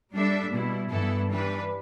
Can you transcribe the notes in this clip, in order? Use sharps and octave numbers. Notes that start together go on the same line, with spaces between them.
G3 D4 A4 E5
B2 G3 E4
G2 E3 B3 E4 A4
E3 G3 D4 B4